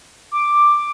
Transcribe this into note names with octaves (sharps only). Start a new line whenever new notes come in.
D6